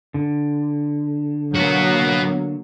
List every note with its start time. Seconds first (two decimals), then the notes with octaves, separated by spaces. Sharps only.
0.14 D3
1.55 F#3 A#3 B3 F#4